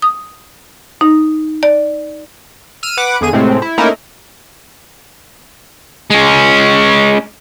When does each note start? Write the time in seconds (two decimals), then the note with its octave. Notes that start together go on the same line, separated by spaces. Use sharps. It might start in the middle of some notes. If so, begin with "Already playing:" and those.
0.02 D#6
1.01 D#4
1.63 D5
2.83 E6 F6 D#7
2.97 B4 F#5 D6
3.21 E2 D3 G#4 D#7
3.33 A2 C3 G#3 A3 C4
3.62 E4
3.78 A3 A#3 C#4 D#4 E4 A#4
6.10 G#3 C#4